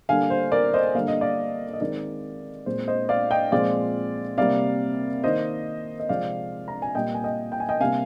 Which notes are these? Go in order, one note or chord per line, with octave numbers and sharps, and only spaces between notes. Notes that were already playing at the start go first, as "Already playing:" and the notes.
D3 G3 A#3 F5 G#5
C5
A#4 D5
C5 D#5
D3 G3 A#3 F5
D#5
D5 F5
D#5
D#3 G#3 C4 A#4 D5
A#2 G#3 C4 C5
C5 D#5
D5 F5
D#5 G5
A#2 F3 G#3 C4 D5 F5
C3 G3 A#3 D5 F5
D#3 A#3 C5 D#5
D#5
C3 F3 G#3 C4 D5 F5
A#5
G#5
A#2 G3 A#3 D#5 G5
G#5
D#5 G5
G5
G#5
D#5 G5
C3 G3 A#3 F5 G#5